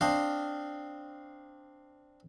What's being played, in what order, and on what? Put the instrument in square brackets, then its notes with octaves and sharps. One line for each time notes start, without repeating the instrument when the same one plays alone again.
[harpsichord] C4 D4 C5 D#5 F5